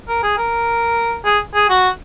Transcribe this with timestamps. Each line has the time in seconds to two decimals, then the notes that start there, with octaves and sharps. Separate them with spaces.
0.08 A#4
0.23 G#4
0.38 A#4
1.25 G#4
1.55 G#4
1.69 F#4